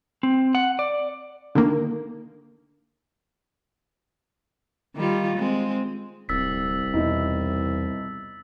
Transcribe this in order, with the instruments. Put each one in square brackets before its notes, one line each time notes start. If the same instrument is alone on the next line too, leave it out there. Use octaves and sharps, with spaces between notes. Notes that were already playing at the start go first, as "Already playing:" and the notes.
[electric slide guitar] C4
F#5
D5
[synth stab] D3 D#3 A#3
[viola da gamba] D#3 G3 F4
G#3 C4
[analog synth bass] D1 [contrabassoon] C2 [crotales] E6 A6 B6
[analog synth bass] E2 [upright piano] B2 D#4 E4